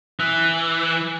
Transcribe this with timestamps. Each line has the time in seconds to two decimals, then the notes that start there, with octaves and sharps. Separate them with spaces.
0.20 E3